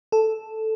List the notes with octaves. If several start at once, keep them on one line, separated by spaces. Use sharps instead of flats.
A4